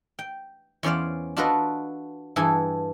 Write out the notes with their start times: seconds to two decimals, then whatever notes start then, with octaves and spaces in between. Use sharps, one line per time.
0.19 G5
0.83 E2 C#4 C5 D5 F5
1.37 D4 F4 F#4 A4 B4 D#5
2.36 G2 E3 G#4 A4 G#5